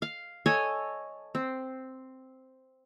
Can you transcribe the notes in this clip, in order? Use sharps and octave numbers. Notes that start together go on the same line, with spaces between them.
F5
A4 C#5 D#5 G#5
C4